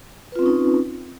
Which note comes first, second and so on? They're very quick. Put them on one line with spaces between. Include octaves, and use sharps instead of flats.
B4 F4 C4 C#4 D#4